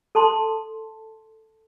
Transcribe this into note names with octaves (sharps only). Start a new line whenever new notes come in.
A4 A5 C6